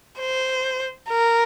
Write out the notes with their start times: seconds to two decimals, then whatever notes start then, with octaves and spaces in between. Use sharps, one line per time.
0.19 C5
1.09 A#4